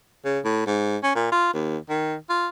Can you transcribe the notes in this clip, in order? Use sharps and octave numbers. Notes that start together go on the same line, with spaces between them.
C#3
A2
G#2
C#4
A#2
F4
D#2
D#3
F4